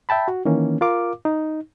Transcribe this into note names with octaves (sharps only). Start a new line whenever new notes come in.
E5 G5 A5 B5
F#4
D#3 E3 A#3 C#4
F4 A#4 F5 D6
D#4